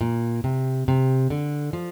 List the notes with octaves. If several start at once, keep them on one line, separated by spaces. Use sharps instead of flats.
A#2
C3
C3
D3
F3